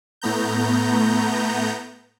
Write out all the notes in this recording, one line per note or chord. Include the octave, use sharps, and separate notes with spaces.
A2 A3 B3 A#5 G6